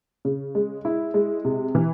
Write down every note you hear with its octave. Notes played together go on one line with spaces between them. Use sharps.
C#3
G#3
E4
G#3
C3
E3